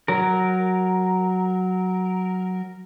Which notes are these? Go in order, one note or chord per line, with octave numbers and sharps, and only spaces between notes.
F#3 A#4